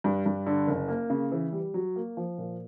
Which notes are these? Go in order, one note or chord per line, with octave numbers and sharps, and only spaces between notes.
G2
G2
D3
F#1
A#3
C#3
E3
G3
F#3
A#3
F3
A#2